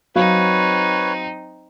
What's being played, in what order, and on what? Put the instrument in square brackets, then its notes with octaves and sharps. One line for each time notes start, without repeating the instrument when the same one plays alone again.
[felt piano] F#3 F5 [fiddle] C4 D#4 [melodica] B4 C#5